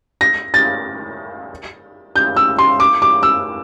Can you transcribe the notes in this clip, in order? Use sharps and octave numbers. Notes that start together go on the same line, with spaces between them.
A#6
A6
G6
E6
C6
D6
D6
E6